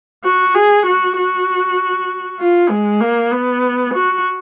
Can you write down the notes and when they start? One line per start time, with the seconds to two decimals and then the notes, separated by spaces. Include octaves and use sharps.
0.24 F#4
0.55 G#4
0.87 F#4
1.16 F#4
2.40 F4
2.70 G#3
3.01 A#3
3.31 B3
3.94 F#4